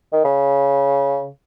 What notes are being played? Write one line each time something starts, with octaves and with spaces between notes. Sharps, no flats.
D#3
C#3